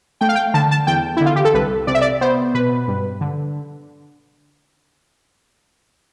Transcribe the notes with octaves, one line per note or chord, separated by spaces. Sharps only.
A3 G5
F5
G5
D3 A5
A5
E2 G5
D3 E4
F4
G4
A4
C2 B4
C3 D5
E5
D5
B3 C5
B2 B4
G2
D3